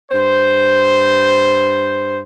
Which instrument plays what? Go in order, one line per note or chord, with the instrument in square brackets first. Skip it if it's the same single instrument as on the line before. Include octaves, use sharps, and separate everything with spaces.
[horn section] G2 C5